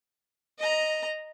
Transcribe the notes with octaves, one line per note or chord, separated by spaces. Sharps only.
D#5 A#5